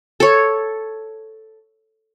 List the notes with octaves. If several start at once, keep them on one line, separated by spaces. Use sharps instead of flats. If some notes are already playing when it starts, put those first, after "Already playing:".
A4 C#5